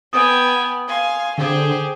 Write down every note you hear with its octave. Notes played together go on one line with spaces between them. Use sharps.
B3 G5 G#5 D#6
F5 G#5 C6
D3 G4 G#4 C5